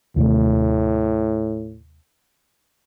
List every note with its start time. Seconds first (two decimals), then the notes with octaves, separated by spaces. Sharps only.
0.16 D#2 A2 C3 A3